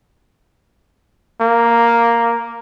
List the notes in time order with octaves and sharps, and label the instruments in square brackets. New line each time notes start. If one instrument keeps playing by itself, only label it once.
[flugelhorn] A#3